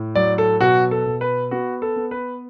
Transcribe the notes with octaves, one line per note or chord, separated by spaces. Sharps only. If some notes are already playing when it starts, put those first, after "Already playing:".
Already playing: A2
F#3 D5
A4
B2 F#4
A4
B2
B4
B3 F#4
A4
B3
B4